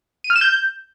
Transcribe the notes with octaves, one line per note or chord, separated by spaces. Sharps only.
D#7
F6
E7
G6